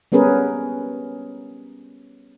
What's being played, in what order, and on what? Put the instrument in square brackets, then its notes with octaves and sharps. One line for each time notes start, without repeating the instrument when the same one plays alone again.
[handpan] G3 B3 C#4 G#4 A#4 B4